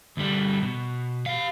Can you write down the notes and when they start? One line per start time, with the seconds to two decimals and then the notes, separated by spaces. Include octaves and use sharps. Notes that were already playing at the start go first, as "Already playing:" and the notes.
0.17 D2 G3
0.62 B2
1.26 G4 F5